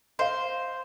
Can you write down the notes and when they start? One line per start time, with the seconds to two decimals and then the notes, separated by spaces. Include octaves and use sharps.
0.19 C5 D#5 F5